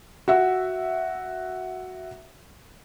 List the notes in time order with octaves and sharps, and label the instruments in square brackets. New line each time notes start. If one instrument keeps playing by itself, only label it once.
[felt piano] F#4 E5